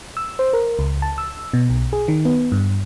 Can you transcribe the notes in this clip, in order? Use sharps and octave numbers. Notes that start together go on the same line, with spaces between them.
E6
C5
A#4
C#2
A5
E6
B2
B1
G#4
D#3
B3
G2